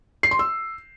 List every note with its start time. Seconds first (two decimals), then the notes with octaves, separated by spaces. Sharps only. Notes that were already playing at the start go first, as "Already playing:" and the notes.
0.23 C7
0.31 C6
0.39 E6